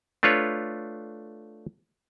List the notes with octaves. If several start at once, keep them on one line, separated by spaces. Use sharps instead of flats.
A3 D4 F4 B4 C#5